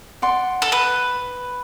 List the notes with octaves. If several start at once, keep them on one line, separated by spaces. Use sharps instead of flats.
D5 F#5 C6
A4
B4